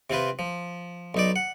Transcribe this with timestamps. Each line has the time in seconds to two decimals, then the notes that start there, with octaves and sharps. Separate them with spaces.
0.10 C3 C4 F4 B4
0.39 F3
1.14 B1 D#4 D5
1.36 F#5